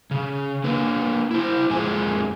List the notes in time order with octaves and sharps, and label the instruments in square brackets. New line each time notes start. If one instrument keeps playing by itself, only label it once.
[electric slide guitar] C#3
A#3 D4 B4
E4 C5
F2 F3 G#3 G#5